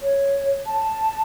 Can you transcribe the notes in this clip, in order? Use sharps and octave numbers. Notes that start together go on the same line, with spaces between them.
C#5
A5